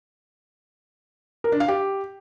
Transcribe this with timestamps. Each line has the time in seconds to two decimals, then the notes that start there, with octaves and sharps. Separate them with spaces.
1.44 A#4
1.52 D4
1.60 F5
1.68 G4